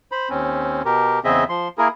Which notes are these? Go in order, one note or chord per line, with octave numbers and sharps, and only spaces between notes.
C5 B5
D#2 C4 C#4
B2 G4 A#4
E2 C#3 C4 G#4 D#5 E5
F3 C6
A#3 E4 G#4 A#4